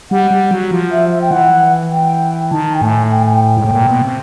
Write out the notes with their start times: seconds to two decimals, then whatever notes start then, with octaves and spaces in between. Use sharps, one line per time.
0.11 G3 F#5
0.31 G3
0.51 F#3
0.71 F3
0.91 E5
1.12 E5
1.22 G5
1.31 E3 F#5
1.91 G5
2.51 D#3 A5
2.75 G5
2.81 A2 G#5
3.12 G5
3.22 G#5
3.34 G5
3.57 G#2
3.64 A2
3.71 A#2
3.86 B2
4.02 C3